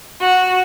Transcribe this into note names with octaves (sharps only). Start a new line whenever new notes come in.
F#4